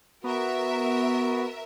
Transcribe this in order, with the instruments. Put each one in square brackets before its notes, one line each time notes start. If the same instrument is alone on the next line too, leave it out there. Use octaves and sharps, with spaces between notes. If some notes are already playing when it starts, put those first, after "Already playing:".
[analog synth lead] B3 [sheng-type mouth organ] F#4 [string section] A#4 E5